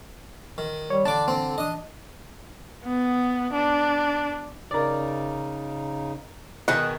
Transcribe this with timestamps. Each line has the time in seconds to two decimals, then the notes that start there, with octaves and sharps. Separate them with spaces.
0.58 D#3
0.90 G3 C#5
1.05 D3 D4 A5 D6
1.28 C4
1.58 D4 D#5 D#6
2.85 B3
3.53 D4
4.71 C#3 D#4 A#4 D5
6.68 B2 D#3 G#4 F#5